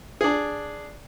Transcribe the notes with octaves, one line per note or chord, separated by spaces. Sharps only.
D4 G#4